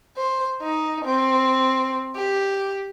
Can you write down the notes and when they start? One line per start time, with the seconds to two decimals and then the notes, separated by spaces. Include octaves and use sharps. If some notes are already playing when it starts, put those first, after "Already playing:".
0.17 C5
0.61 D#4
1.04 C4
2.15 G4